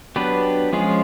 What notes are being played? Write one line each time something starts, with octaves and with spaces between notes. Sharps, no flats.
F#3 B3 D4 G4 B4
F3 G#3 C#4 F4 G#4